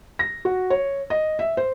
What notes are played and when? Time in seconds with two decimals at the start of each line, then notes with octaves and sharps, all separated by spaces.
0.19 A#6
0.45 F#4
0.70 C#5
1.10 D#5
1.39 E5
1.57 C5